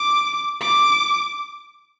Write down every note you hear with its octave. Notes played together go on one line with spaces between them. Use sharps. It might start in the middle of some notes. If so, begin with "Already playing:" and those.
Already playing: D6
D6